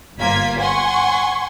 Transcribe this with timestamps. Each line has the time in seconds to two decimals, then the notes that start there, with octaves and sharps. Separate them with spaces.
0.19 G1 A#3 F4 G#6 B6
0.59 F#5 G#5 C6 C#6